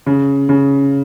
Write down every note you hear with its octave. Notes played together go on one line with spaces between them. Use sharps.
C#3
C#3